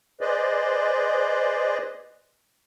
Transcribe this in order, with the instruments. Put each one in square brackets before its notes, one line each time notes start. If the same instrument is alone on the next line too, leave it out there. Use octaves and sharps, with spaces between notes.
[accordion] G#4 B4 C5 D5 D#5